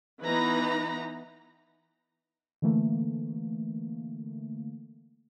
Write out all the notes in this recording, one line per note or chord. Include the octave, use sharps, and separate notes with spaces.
E3 B3 D#4 B4 A#5 B5
D3 E3 A3 A#3